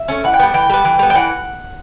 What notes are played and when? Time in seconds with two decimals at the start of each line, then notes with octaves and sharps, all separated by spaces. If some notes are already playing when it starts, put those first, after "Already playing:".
Already playing: E5
0.08 A3 C#4
0.24 E3 F#5
0.34 G5
0.39 G3 B3
0.54 E3 G5
0.70 G3 B3
0.85 E3
0.99 G3 B3
1.10 G5
1.15 E3 F#5